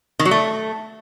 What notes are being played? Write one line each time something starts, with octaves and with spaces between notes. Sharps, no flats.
D#3
F#3
A3